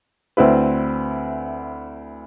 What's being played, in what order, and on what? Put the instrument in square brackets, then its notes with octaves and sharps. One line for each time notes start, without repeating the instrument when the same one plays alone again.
[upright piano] D2 C4 E4 B4